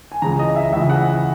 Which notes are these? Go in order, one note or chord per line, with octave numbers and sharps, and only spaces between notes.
G#5
C#2 C#3 E3 A#5
D#5
E5
C#2 C#3 E3 E5
F#5